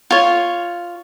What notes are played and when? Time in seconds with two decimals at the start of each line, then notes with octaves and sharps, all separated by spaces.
0.11 F4 C#5